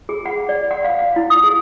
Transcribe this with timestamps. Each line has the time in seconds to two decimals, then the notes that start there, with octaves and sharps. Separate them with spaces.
0.09 G#4
0.26 F#5
0.49 D5
0.71 F#5
0.84 F5
0.99 F5
1.16 E4
1.30 D#6
1.44 G#4